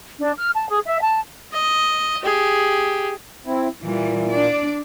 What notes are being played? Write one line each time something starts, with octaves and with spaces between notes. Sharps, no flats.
D4
F6
A5
G#4
E5
A5
D#5
G4 G#4
C4 E4
A#2 E3 G3
D4 D5